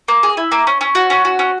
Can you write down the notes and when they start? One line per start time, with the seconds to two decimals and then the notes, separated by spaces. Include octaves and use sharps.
0.08 A#3
0.23 G#4
0.37 E4
0.52 A#3
0.67 C#4
0.81 C#4
0.95 F#4
1.10 C#4
1.25 F#4
1.39 C#4